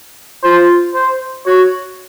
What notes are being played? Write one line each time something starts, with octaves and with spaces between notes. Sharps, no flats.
F4 C5
C5
F#4 C#5